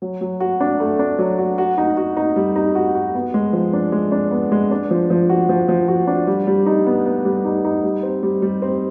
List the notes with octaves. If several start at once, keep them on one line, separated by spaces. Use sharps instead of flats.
F#3
F#3
F#4
D4
A3
D4
F#3
F#4
F#4
D#4
F#4
D#4
G3
D#4
F#4
F#4
B3
G#3
F3
D4
G#3
D4
B3
G#3
D4
F3
F3
F#4
F3
F3
F#4
D4
G3
G3
D#4
B3
B3
G3
D#4
D#4
G3
C4
G3
G3
C4